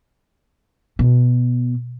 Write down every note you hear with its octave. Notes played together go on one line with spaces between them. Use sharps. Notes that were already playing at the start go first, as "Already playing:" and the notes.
B2